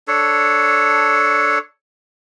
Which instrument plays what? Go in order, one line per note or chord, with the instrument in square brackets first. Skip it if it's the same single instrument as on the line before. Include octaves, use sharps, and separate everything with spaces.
[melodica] D4 A4 C#5